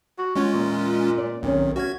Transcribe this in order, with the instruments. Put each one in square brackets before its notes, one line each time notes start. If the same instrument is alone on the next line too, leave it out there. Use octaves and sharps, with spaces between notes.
[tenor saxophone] F#4
[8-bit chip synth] G#3 C#4 F4 [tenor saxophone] C#5
[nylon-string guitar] E2 [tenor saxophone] A#2
[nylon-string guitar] D5
[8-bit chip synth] B1 [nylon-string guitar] C3 D#3 C#4
[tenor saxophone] C#4 [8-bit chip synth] F#4 G#6 [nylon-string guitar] E5 F#5